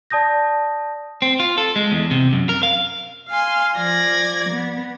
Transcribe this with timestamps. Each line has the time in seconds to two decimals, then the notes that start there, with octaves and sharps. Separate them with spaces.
0.10 D5 A5 D#6 G6 A#6
1.22 C4
1.40 F4
1.58 A4
1.76 G#3
1.92 E2
2.11 C3
2.33 F#2
2.49 A#4
2.63 F5
3.28 F5 G#5 C6
3.77 F3 D5 G#6 A#6
4.50 B3